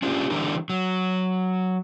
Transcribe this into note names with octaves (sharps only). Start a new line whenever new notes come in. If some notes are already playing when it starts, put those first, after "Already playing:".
C#4 D4 F4 G4
D3 E3 G3 D4 A#4
F#3